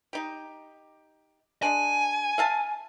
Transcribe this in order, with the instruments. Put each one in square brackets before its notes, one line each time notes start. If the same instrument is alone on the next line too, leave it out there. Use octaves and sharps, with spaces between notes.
[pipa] D#4 G4
[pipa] G#3 D4 [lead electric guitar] G#5
[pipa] E5 F5 A5